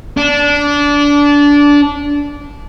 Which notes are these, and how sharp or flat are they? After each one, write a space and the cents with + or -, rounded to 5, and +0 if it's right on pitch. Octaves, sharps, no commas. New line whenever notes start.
D4 -20